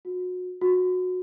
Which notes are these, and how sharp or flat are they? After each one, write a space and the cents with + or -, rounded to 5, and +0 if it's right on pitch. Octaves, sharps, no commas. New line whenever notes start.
F#4 -30
F#4 -20